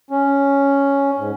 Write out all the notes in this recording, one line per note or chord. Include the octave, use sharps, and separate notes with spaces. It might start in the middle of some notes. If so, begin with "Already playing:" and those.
C#4
G#2